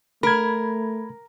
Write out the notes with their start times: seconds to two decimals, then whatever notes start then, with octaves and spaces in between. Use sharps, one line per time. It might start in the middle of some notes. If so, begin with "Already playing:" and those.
0.23 A3 A#4 B5 G#6